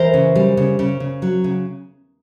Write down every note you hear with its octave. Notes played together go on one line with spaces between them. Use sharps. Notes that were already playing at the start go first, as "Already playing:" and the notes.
Already playing: E3 A#4 C5
C#3
G3
C#3
C#3
C#3
F#3
C#3